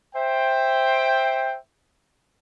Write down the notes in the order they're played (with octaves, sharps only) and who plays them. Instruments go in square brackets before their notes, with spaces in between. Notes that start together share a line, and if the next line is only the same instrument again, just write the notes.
[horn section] C5 E5 G5